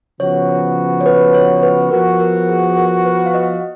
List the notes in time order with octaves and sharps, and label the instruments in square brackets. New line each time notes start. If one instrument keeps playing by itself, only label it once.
[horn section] C#3 F3 B3 F#4 [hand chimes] C#5
[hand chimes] C#5
B4
C#5
B4
[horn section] F3 B3 F#4 [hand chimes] A#4
[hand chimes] A#4
G#4
A#4
B4
F5
D#5